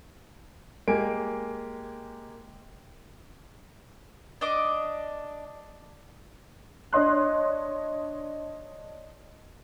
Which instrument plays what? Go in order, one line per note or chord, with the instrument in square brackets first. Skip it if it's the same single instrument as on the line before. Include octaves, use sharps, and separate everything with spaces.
[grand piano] G#3 A#3 G4 G#5 D7
[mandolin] D4 D#5 D6
[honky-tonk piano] D4 C#5 D#5 C6 F#6